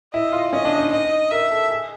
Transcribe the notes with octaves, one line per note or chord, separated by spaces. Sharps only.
E4 D#5
F4
C#4 D#5
D4
D#4
D#4 D#5
D#4
A#4 E5
A4
G#4